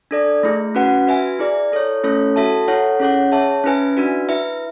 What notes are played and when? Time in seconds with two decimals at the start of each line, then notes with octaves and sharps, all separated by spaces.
0.11 D4 A4 D5
0.43 A3 E4 G#4
0.75 C#4 F#4 B4 F#5
1.07 F#4 B4 E5 G#5
1.39 E4 G#4 D5
1.72 E4 A4 C#5
2.04 A3 C#4 E4 A4 C#5
2.36 F#4 A4 E5 A5
2.68 E4 A4 C#5 F#5
3.00 C#4 G#4 C#5 F#5
3.32 G#4 C#5 E5 A5
3.64 C#4 E4 B4 E5 G#5
3.97 D4 F#4 B4
4.29 E4 B4 E5